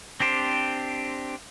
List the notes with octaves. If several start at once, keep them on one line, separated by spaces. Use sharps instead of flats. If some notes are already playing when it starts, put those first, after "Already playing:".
C4 D4 G4 C5